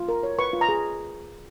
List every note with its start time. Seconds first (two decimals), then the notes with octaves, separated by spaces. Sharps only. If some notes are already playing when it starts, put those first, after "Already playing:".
Already playing: F4
0.08 A#4
0.23 C#5
0.38 B4 C#6
0.53 F4
0.61 A#5
0.69 G#4